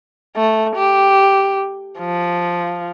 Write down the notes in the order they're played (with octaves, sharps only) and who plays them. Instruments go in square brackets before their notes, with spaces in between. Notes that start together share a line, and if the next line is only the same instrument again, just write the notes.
[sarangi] A3
G4
F3